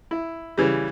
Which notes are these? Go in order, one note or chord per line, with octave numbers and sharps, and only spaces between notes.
E4
C#3 E3 G3